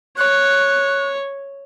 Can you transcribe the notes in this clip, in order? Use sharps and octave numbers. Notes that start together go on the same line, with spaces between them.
C#5 F#6